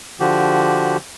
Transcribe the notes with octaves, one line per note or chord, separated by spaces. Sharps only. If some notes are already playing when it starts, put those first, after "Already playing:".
D3 F3 F#4 G4